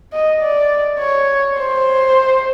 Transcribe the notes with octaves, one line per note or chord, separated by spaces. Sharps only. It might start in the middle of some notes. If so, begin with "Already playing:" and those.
D#5
D5
C#5
C5